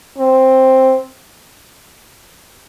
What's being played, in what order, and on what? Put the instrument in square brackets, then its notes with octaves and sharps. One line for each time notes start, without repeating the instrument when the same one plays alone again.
[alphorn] C4